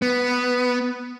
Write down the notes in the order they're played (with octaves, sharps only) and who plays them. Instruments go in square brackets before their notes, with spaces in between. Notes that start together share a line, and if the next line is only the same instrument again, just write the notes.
[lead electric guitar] B3